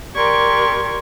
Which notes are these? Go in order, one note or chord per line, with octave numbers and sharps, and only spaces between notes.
G4 A#4 D5 C6 C#6 G#6